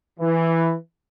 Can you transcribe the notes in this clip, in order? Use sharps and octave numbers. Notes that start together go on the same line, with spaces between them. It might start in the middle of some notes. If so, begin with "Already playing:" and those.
E3